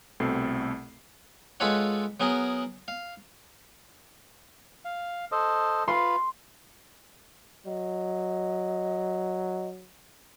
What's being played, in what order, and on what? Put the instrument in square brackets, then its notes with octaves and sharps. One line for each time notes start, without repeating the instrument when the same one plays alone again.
[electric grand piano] C2 B2 A3 C4 A4 C7
[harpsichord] G#3 F4 A4 B4 C#5 F#5
F#3 B3 G#4 A#4
F5
[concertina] F5
A4 C5 D#5
[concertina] F4 B4 [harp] C6
[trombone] F#3 [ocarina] D#5